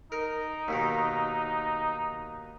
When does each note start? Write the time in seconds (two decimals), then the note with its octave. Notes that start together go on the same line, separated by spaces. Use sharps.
0.12 D#4 A#4
0.68 D#2 B2 D#3